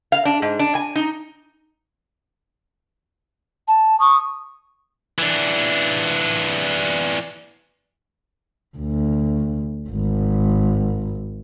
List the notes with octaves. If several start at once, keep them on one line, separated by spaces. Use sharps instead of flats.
F5
D4
G#2
D4
G#5
D#4
A5
C#6 D#6
E3 D4
D2
G#1